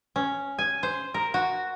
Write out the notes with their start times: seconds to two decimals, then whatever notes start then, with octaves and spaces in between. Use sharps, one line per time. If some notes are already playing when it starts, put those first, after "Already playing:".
0.16 C#4
0.59 G#5
0.83 C5
1.14 A#4
1.34 F#4